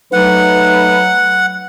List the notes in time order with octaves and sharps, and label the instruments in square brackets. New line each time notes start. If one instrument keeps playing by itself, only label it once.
[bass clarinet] F#3 [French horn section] A3 D#4 B4 [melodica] F#5